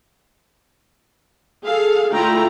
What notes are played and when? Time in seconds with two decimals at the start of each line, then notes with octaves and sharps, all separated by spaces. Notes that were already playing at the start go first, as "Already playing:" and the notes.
1.65 G#4 A4 F5
2.13 D3 A3 E4 F4 G5 A#5